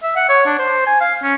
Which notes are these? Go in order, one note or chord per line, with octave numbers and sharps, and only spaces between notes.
E5
F#5
C#5
D4
C5
G#5
F5
C#4